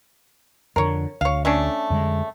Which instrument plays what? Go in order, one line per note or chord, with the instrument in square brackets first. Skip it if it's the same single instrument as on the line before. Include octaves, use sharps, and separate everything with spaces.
[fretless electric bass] F2 D3 [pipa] A#4 C#5
[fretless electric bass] D2 [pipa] C#5 F5
[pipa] A3 C#4 D4
[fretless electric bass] F2 D3 G#3